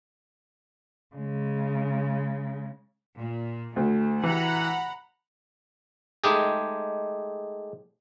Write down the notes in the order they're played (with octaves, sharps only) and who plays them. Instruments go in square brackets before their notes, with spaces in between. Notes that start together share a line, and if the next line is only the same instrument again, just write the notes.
[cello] C#3 G#3
[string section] A#2
[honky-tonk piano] D2 [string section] A3
[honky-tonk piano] E3 G4 [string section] F#5 A#5 B5
[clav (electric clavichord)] G#3 A3 D#4 G4 G#4